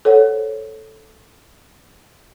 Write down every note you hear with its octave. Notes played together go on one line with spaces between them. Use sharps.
A4 C5 C#5 F#5